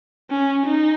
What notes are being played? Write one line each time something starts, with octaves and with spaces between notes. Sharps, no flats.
C#4
D#4